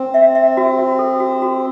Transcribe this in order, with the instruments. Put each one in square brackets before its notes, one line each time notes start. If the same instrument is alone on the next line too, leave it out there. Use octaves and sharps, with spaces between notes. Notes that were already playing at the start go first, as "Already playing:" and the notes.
Already playing: [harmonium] C4
[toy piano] E5
E5
F#4
F#4
A4
F#4
F#4